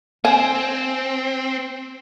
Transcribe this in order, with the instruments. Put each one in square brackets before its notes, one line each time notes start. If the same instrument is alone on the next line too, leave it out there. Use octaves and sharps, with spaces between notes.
[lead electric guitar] C4 [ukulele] G#5